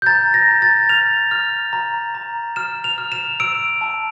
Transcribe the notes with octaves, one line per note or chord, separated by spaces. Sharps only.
G6
A#5 A6
A#6
A#5
A6
F6 F7
F6
A#5
A#5
F6 E7
F7
F6
E7
E6 D7
A5